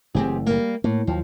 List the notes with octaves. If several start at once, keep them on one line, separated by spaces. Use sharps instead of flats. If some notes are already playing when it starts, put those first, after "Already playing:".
F#1 E3 A3 C4 G4 G#4
G3 A#3
A2 A#3
D#2 F3 F#3